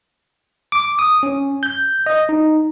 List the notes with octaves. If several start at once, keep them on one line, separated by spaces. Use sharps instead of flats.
D6
D#6
C#4
G6
D#5
D#4